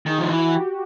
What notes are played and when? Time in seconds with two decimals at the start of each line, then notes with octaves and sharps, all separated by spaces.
0.06 D#3 G#4
0.19 F3
0.29 E3 F#4
0.53 G4